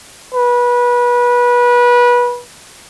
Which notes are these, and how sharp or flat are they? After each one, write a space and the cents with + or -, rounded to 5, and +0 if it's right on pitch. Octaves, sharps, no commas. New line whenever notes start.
B4 -25